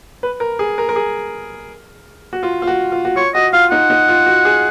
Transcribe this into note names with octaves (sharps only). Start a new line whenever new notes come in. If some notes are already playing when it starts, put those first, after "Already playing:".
B4
A#4
G#4
A#4
A#4
G#4
F#4
F4
F4
F#4
F4
F#4
F4 C#5
F#4 D#5
F4 F5
D#4 F#5
D#4
F4
F#4
G#4